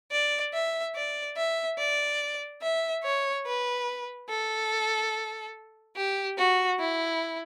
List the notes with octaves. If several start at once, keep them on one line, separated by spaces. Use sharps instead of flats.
D5
E5
D5
E5
D5
E5
C#5
B4
A4
G4
F#4
E4